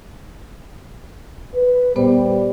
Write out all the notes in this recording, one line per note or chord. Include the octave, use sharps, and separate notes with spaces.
B4
A#2 G3 B3 C5